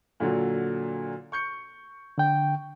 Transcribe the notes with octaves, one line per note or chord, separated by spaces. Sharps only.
A#2 D3 F#3
C#6 G6 C#7
D3 G5